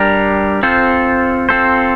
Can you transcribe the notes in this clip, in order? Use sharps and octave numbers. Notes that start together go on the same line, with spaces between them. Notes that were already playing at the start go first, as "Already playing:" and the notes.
Already playing: G3 D4 G4 A#4
C4 F4 A4 C5
C4 F4 A4 C5